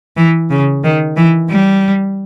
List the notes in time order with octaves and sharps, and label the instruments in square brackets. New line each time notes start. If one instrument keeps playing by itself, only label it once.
[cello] E3
C#3
D#3
E3
G3